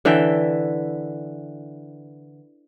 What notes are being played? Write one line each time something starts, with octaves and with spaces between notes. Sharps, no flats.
D3 E3 E5 G5